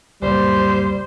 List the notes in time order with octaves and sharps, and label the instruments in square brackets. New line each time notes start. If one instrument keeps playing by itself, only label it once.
[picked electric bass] C#2 F#2 A#2 [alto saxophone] G3 [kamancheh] C5